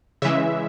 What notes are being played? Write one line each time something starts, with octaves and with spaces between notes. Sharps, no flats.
C#3 E3 G#3 E5